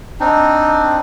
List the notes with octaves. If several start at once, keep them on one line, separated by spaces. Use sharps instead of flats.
C4 D4 D#4